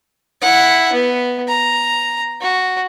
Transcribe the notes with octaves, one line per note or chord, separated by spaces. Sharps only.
E4 F#5
B3
A#5
F#4